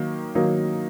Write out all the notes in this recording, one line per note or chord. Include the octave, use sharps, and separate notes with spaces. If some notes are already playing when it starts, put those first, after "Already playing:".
Already playing: D#3 F#3 A#3 D#4
D#3 F#3 A#3 D#4